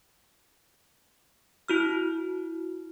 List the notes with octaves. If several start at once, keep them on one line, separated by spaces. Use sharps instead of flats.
E4 F#4 F6